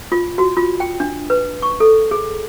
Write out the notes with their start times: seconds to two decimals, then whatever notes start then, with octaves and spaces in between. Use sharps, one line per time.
0.12 F4
0.38 F#4
0.57 F4
0.80 G5
1.00 D4
1.30 B4
1.62 C#6
1.80 A4
2.11 G#4